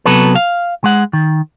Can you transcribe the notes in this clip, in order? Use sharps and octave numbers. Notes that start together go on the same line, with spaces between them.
C3 F#3 B3 A4 B4
F5
G#3 F#5
D#3